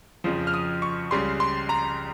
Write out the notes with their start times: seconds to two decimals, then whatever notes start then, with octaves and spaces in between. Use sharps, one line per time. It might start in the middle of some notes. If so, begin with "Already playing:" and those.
0.24 F2 C#3 F3
0.47 F6
0.54 D#6
0.82 C#6
1.11 C#2 C#3 G3 C6
1.40 C6
1.69 A#5